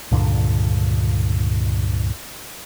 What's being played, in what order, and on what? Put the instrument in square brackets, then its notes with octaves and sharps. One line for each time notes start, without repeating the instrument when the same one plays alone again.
[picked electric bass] C#2 G2 A#2 D3